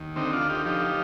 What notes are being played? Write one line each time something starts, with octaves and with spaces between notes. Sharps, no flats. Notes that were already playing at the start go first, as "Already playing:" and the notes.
Already playing: D#2
D3 C4 D#4
D4 F4
D3
D#4 G4
F3 D#4 G4